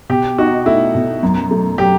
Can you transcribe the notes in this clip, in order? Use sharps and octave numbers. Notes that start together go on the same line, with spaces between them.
B2 G4
D#4 F#4
A3 E4
B2
F#2
A3
F#3 G4